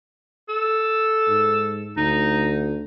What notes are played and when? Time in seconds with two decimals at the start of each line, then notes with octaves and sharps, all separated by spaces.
0.49 A4
1.28 G#2
1.97 D2 D#4